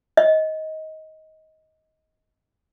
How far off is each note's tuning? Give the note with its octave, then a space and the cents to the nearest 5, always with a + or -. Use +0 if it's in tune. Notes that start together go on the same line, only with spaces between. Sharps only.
D#5 +20